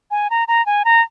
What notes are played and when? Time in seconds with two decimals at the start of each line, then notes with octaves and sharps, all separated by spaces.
0.11 G#5
0.30 A#5
0.48 A#5
0.66 G#5
0.85 A#5